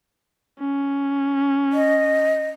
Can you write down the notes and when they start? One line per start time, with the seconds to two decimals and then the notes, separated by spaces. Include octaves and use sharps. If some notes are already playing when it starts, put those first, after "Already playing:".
0.60 C#4
1.73 D#5